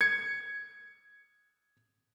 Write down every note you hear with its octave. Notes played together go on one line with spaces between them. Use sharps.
G#6 C#7